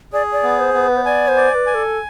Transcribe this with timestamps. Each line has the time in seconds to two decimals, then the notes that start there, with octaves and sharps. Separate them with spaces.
0.13 G#4 D5
0.32 D5
0.43 B3
0.59 C5
0.74 B3
0.88 B4
0.97 C5
1.05 D5 G#5
1.28 C5
1.36 D5
1.51 C5
1.54 B4
1.67 G#5
1.74 A4